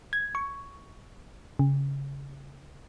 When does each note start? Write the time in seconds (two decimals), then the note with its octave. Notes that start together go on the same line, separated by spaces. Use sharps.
0.13 G#6
0.35 C#6
1.59 C#3